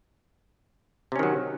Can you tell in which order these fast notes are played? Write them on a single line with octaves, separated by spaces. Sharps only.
C3 C#4 D#3 F#3